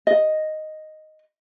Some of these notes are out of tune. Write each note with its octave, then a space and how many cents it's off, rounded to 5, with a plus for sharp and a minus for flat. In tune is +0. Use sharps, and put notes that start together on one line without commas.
D#5 +0